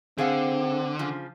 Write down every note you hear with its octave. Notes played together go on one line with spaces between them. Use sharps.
D3 C4 G#4 F5 F#5
C#3 F3